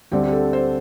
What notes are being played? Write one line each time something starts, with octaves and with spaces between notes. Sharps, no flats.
D2 D3 G3 C4 G4
G4
A4
C5